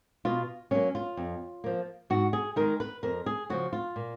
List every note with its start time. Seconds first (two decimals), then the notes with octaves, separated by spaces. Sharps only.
0.25 B2 F4
0.71 F#3 A#3 C#4
0.95 F4
1.17 F2
1.64 F3 A#3
2.10 G#2 F#4
2.33 G#4
2.56 D#3 G#3 A#4
2.80 B4
3.03 F2 A#4
3.26 G#4
3.50 C#3 F3 F#4
3.73 F4
3.96 A#2